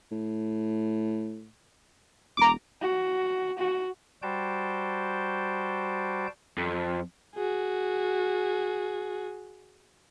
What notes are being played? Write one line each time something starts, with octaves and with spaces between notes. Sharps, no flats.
A2
E1 A#5 D6
F#4
F#4
G3 F#4 C5 G5 A5 G6
F2
F#4 G#4